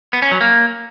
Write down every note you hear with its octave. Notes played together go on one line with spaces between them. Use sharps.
B3
C#4
F#3
A#3